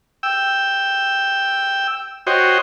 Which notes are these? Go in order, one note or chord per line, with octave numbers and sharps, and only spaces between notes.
G5 E6
F#4 C5 C#5 D#5 G5